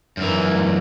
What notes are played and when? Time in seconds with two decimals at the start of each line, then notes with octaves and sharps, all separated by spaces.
0.17 F#2 E3